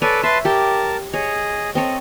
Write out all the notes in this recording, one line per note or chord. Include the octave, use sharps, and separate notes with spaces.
A4 B4 C#5 D5 G#5
B4 E5 A5 C6
G4 A#4 G5 A5
G#4 C#5 D#5
C4 A4 C#5 D#5